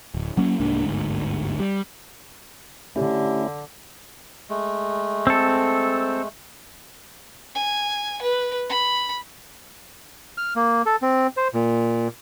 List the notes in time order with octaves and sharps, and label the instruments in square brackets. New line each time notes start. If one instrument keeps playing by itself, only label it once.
[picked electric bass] D1
F#3 A#3 C#4
C2 G#2 A#3 D4
G1 D2 G#2
G3
[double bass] D3 [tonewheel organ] A3 C#4 E4 [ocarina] G4
[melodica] G#3 A3
[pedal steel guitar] C4 A4
[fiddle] G#5
B4
B5
[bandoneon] F6
A#3
A4
C4
C5
A#2